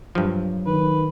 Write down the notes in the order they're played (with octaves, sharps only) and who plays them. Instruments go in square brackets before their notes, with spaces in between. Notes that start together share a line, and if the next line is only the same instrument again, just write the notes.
[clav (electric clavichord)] G2 F3 [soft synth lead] F#3
[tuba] D#3 [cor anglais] B4